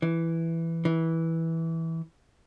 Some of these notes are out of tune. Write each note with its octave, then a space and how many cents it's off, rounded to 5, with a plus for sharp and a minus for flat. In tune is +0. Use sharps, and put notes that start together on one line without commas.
E3 +5
E3 -10